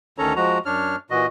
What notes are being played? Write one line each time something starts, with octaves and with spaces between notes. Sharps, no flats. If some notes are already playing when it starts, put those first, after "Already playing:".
D2 D#3 C#4 A4 C#5 A#5
F3 G#3 F#4 A#5
F#2 D4 C#5 F6
A#2 E3 F#4 D#5